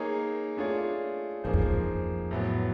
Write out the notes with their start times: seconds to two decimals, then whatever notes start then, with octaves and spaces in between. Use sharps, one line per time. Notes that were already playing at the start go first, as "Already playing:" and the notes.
Already playing: A#3 D#4 G#4 C#5
0.57 A3 D4 F4 G#4 C#5
1.44 F#2 F3 A#3 D#4 G#4 C5
1.53 F2
1.62 E2
1.71 F2
2.31 A2 F#3 B3